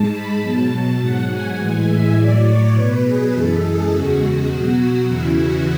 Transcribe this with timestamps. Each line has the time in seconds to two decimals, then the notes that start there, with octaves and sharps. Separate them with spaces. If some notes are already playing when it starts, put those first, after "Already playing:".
Already playing: G#2 G#3 A5
0.12 B5
0.41 B2 F#3 A5
0.70 A5
0.99 G#2 F#3 F#5
1.29 G#5
1.57 A2 E3 G#3 G#5
1.87 E5
2.16 A2 F#3 D5
2.45 C#5
2.74 B2 F#3 B4
3.04 G#4
3.33 F#2 E3 G#3 A4
3.62 G#4
3.91 E2 C#3 G#3 F#4
4.50 B2 F#3
5.07 E2 C#3 E3 E4
5.37 F#4